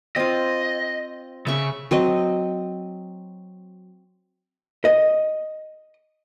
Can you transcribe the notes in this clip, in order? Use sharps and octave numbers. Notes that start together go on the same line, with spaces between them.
C4 F4 D#5
C#3 E5 C#6
F#3 C4 D#5
D#5